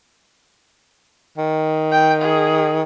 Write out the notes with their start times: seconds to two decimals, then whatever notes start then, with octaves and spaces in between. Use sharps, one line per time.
1.37 D#3
1.92 G5
2.22 G#4